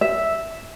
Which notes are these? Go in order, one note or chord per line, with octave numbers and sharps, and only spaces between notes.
E5